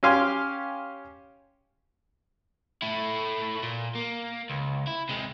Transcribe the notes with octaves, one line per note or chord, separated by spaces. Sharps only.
C#4 G4 F5 G#5 C6
A3 E4
A#2
A#3
C#2
E4
C3 G#3